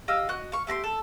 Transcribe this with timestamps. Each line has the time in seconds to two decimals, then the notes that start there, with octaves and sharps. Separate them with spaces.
0.08 G4 D#5 F5 E6
0.29 F#4 D#5 F#6
0.52 F5 C#6
0.67 A3 G4 A#5 C6
0.84 A4